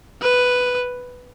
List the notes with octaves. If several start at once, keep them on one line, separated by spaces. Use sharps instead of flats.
B4